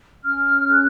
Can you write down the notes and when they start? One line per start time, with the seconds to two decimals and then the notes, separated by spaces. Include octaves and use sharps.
0.24 C#4 F6
0.69 G#4 F#6